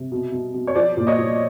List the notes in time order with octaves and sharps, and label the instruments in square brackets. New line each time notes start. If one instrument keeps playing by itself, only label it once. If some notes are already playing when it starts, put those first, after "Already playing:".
Already playing: [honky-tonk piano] C3
B2
B2
B2
C#5
F3 C5 D5
A#2
C#5 D#5
A#2